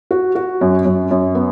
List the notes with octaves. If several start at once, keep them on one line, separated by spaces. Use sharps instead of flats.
F#4
F#4
F#2
F#2
F#2
B3